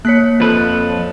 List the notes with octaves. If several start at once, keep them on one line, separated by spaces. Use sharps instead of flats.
A#3 C#5 F#6 B6 C#7
F2 F3 A4 B4